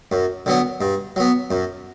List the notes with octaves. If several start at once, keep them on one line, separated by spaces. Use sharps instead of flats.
F#2
D3 F#3 B3
G2
F#3 B3
F#2